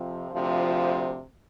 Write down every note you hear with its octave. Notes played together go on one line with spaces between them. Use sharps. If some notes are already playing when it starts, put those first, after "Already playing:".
Already playing: F2 C3 F3
D2 C3 F3